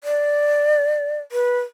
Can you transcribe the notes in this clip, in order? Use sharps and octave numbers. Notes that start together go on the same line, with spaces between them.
D5
B4